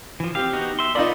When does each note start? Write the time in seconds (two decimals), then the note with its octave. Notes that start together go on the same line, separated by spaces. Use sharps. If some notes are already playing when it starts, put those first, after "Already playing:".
0.20 E3 F3
0.35 C4 G4 F5
0.53 B3 D#4 F#4
0.79 E5 C6
0.95 B3 D#4 F4 A#4 D5 B5